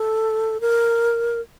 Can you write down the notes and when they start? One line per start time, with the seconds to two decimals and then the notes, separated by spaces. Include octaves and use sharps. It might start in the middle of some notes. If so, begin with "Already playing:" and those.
Already playing: A4
0.61 A#4